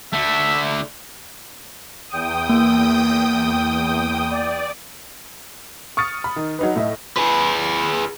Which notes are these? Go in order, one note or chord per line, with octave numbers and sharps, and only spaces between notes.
D3 A3 E5
E2 G5 D#6
A#3
D5
C#6 D#6 F6 A6 C#7
B5
D#3
F#3 D#4 B4
A2 E4 D#5
G#4 B4